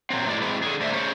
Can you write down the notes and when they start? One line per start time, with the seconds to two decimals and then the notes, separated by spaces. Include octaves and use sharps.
0.10 A#2 D#3 F#3 C4
0.26 A2 E3 G#3 D5
0.42 E3 G#3 C4 G#4 B4
0.62 D3 G#4
0.81 A#2 A3 D4 C5 D5 E5
0.93 C#4 G#4 C5 C#5